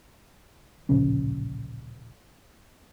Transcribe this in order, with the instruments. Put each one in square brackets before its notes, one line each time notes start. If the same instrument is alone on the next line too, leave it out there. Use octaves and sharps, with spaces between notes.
[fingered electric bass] D1 A#1 C#3 C#4